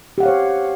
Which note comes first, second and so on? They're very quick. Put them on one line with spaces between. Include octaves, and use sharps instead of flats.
G4 F#5 F5 C#5 C5